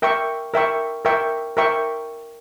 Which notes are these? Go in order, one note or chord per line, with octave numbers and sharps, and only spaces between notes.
A#4 E5 G5 C#6
A#4 E5 G5 C#6
A#4 E5 G5 C#6
A#4 E5 G5 C#6